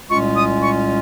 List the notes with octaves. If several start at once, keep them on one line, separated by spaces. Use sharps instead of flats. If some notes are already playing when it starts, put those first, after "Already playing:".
C2 A#2 G#3 C#4 F4 C#6
D#6
C#6